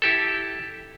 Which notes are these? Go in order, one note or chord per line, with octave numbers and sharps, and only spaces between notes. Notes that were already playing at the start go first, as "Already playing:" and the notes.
E4 G4 A4